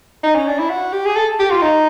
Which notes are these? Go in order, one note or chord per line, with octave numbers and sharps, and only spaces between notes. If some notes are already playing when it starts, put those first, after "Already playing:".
D#4
C#4
D4
E4
F#4
G4
G#4
A4
G4
F4
D#4